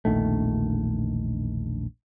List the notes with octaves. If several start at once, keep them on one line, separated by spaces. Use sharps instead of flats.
E1 A#1 D#3 A3